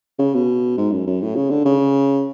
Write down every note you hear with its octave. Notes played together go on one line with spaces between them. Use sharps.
C#3
B2
G#2
F#2
F#2
A2
C#3
D3
C#3